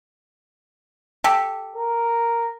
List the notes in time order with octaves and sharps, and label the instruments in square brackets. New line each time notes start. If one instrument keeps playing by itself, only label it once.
[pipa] G4 A4
[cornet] A#4